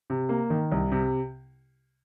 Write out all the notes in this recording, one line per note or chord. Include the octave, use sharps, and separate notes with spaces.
C3
A#3
D#3
C2
C3